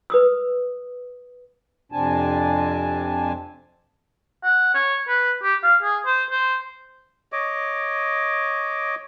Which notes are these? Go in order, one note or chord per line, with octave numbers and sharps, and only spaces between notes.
B4 D#6 E6
F2 C3 C4 D4 G#5 A5
F#5
C#5
B4
G4
F5
G#4
C5
C5
C#5 D#5 D6